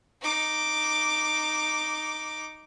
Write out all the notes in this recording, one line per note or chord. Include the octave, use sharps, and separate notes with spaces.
D#4 D6